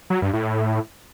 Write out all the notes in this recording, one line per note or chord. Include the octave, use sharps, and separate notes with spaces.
F#3
G2
A2